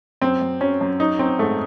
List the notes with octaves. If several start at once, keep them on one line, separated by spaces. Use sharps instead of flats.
F#2 C4
F#2
F#3 C#4
F#2
F#3 D#4
F#3 C4
G#2 A3